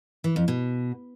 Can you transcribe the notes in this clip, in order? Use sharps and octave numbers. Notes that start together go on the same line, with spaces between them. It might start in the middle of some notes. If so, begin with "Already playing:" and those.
E3
F2
B2